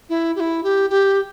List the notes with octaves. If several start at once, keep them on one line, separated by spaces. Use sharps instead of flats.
E4
G4
E4
G4
G4